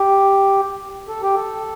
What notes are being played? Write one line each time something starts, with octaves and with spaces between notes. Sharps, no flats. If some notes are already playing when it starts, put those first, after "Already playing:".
Already playing: G4
A4
G4
A4